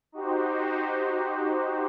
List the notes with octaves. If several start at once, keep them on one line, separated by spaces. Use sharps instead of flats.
D#4 F#4 G4 C5